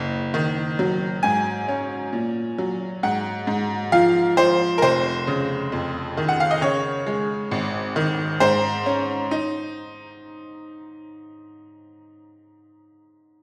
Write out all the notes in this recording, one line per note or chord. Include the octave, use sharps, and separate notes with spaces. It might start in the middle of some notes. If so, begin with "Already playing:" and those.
Already playing: F#1 C#3
D#3
F#3
G#2 G#5
C#4
A#2
F#3
G#2 F#5
G#2
F3 F5
F3 C5
A#4
F1 C5
C#3
F2
D#3
F#5
F5
D#5
C#3 C#5
G#3
G#1
D#3
G#2 C5
C#4
D#4